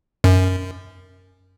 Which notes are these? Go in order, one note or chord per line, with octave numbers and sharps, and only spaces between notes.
F#2